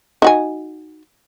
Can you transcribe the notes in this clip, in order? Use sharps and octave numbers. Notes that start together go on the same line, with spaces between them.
D#4 F#4 G#5